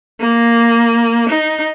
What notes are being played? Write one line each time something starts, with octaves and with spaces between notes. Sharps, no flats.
A#3
D#4